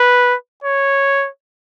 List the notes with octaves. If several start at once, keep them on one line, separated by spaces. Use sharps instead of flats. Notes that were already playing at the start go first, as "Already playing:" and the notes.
Already playing: B4
C#5